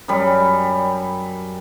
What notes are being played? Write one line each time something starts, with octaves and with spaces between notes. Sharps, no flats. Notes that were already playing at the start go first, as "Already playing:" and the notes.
F#2 G3